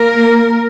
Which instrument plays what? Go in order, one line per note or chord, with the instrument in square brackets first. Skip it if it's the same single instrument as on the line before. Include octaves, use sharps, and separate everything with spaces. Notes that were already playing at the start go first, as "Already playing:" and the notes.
Already playing: [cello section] A#3 A#4